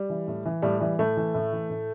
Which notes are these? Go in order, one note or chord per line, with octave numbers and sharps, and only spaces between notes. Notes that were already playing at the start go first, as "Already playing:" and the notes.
Already playing: G3
E3
A2
E3
A2 G3
E3 G3
A2 A3
E3
A2
E3
A2